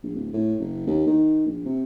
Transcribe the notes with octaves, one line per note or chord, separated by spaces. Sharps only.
A#1
D1
A2
F#1
D#2
D#3
A#1
C3